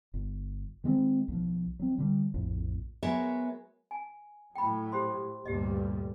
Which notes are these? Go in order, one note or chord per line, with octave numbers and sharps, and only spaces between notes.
G1
D#3 G#3 A#3 C4
B1 F3
F#3 C4
D3 G3
A#1 F2 A2
F#3 G#3 B3 A#4 C#5 E5
G#5
A2 F#3 G5 B5
G4 C5 C6
D2 G2 A#2 G4 D#5